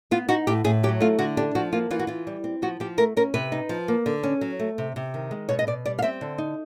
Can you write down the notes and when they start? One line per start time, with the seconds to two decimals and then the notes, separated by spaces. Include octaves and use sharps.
0.11 B3 F4
0.29 D#4 F#4
0.47 A2 G4
0.64 A2 G#4
0.83 F#3 G4
1.00 A3 F4
1.19 D3 F#4
1.37 D4 G4
1.55 F3 F#4
1.73 A#3 F4
1.91 E3 F4
1.99 F#4
2.07 E3 F4
2.27 G3
2.44 C4
2.62 F3 F#4
2.80 F3 G4
2.98 A3 A#4
3.17 C#4 A#4
3.34 C3 B4
3.52 D#4
3.69 F3
3.88 A#3
4.06 D3
4.23 C#4
4.41 F#3
4.59 A3
4.78 C3
4.96 C3
5.14 D#3
5.31 G#3
5.49 B2 C#5
5.59 D#5
5.67 B2 D5
5.86 G3 D5
5.99 F5
6.02 C4 E5
6.21 D3
6.38 D#4